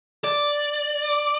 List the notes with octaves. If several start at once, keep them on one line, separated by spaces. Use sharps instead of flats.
D5